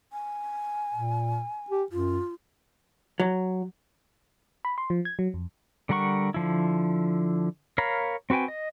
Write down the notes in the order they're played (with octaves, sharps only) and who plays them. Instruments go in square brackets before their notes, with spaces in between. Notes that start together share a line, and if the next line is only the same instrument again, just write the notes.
[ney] G#5
[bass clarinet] A#2
G4
[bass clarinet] F#2 [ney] F4
[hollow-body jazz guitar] F#3
[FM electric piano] B5
C6
F3
G#6
F#3
F2
[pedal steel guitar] D3 G3 A#4 F#5 C#6
D3 F3 E4
A#4 C#5 F5 A#5 B5
C4 F#4 B4 G5 G#5
D#5